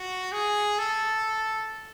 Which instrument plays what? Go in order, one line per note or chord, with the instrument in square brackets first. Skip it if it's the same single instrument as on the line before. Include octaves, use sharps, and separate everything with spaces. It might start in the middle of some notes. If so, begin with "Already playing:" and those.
Already playing: [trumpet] F#4
G#4
A4